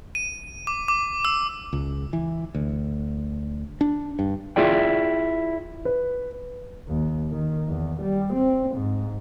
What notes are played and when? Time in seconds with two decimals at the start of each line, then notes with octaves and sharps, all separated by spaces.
0.15 D#7
0.67 D6
0.88 D6
1.25 E6
1.73 C#2
2.13 E3
2.55 D2
3.81 D4
4.19 G2
4.56 E4 F4 G#4 D5 G5
5.85 B4
6.88 D#2
7.32 D#3
7.68 E2
8.02 G3
8.34 C4
8.75 G#2